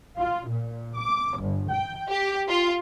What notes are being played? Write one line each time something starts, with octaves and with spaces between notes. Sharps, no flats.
F4
A#2
D6
G1
G5
G4
F4